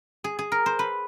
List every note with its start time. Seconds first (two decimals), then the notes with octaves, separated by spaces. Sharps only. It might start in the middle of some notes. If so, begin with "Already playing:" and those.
0.24 G#4
0.39 G#4
0.52 A#4
0.66 C5
0.79 B4